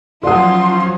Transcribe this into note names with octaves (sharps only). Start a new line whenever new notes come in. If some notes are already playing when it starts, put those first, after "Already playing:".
F3 F#3 C#4 F4 D5 F#5 C6 D#6